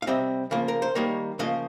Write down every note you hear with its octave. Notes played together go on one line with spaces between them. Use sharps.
F5
C3 G3 C4 D#5
C#3 F3 A#3
A#4
C5
D#3 G3 A#3 C#5
C#3 F3 A#3 D#5